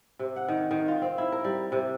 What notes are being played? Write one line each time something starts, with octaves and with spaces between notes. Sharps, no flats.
C3
F#5
D#3
D#3
F4
C4
E4
A#4
G3
C3